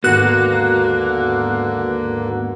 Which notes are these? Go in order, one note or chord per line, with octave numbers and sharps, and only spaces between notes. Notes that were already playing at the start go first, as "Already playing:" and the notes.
D#2 G#2 D3 A#3 B3 F#4 F#6